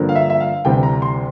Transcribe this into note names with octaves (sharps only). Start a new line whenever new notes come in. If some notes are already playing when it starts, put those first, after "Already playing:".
Already playing: G2 D3 F3 A#3
F5
E5
E5
F5
D2 C3 E3 G3 G5
A#5
C6